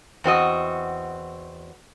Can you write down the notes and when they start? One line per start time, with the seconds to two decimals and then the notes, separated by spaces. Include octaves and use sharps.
0.24 E2 C4 F#4 D#5